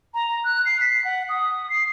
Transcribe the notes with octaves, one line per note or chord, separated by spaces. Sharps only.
A#5
F#6
C7
B6
F#5
D#6
C7